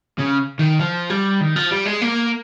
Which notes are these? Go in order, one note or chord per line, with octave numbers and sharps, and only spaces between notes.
C#3
D#3
F3
G3
D#3
F3
G3
G#3
A#3